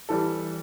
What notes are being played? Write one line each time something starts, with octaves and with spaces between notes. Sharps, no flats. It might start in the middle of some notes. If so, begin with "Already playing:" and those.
E3 G3 A4